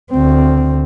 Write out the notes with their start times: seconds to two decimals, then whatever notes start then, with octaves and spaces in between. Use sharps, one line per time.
0.11 D2 C4